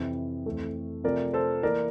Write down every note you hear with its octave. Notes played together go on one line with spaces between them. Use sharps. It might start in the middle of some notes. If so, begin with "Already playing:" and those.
Already playing: F2 C3 E3
F2 E3 A3
C3 F3 A3 A#4 D5
A4 C5
E3 A#3 A#4 D5